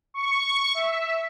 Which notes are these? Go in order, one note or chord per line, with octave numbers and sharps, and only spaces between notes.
C#6
E5